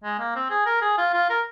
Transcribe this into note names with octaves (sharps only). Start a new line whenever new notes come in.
G#3
A#3
C4
G#4
A#4
G#4
F4
F4
A#4